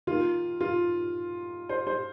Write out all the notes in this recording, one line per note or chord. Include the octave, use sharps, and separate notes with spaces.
D#3 A#3 F4
F4
C5
C5